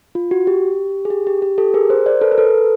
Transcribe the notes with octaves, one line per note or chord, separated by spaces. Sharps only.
F4
F#4
G4
G#4
G4
G4
G4
G4 A4
G#4 A#4
A#4 C5
C5 D5
A4 B4
A#4
A4 B4